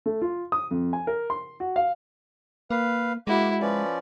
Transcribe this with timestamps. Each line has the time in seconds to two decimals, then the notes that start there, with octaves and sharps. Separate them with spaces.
0.06 A3
0.22 F4
0.52 D#6
0.71 F2
0.93 G#5
1.07 A#4
1.30 C6
1.60 F#4
1.76 F5
2.70 A#3 B4 F5
3.27 G#3 A#3 E4 F#4 D6
3.61 F3 C#4 B4 D5